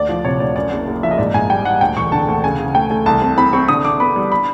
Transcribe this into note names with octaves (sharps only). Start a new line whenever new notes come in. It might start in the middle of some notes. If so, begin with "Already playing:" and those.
Already playing: D2 D5
F3
C3 C#5
D2 D5
F#2 D5
F#1
F#1
F3 E5
D#5
G#2 D5
G#2 G#5
G3 G5
G3 F#5
D2 G5
E1 C#6
D3 A5
D2
C#3 G#5
C#3
A3 G5
A3 G#5
C2 A5
C4
C4 B5
C4 C#6
D3 D#6
D3 D6
B3 B5
G3
B5